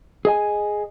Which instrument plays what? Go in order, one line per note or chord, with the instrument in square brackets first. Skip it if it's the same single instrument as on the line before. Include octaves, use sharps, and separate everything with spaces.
[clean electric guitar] G#4 D#5 G#5